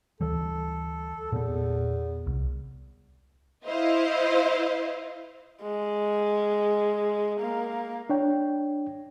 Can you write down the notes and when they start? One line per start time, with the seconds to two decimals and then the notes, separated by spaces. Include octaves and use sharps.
0.21 D2 E3 G3 A4
1.33 E2 A#2 B3
2.27 C2
3.66 E4 C5 D#5 F5
5.63 G#3
7.40 A#3
8.10 D4 C#5 G5